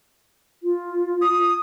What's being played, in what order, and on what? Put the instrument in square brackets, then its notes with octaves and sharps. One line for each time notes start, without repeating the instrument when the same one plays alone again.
[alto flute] F4
[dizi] D#6